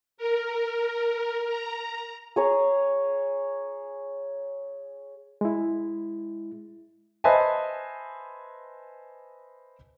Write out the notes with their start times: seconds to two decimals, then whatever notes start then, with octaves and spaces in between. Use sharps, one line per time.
0.18 A#4
1.48 A#5
2.36 G#4 C#5 A#5
5.41 G#3 E4
7.24 B4 C5 D#5 E5 G#5 A5